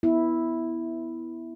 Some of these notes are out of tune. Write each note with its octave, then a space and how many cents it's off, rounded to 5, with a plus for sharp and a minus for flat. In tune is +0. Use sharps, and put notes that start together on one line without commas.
B3 +0 E4 -5